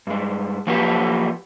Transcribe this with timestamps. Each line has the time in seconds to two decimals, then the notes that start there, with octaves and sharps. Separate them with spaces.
0.07 G2 G#3
0.67 F3 F#3 A#3 F#4 G4 B4